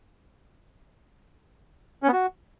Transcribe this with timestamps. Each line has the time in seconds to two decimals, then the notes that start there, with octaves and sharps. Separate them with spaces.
2.03 C#4
2.08 B3
2.13 F#4